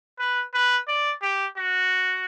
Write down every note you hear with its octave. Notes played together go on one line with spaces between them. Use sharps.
B4
B4
D5
G4
F#4